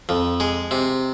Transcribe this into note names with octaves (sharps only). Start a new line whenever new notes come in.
F2
G#3
C3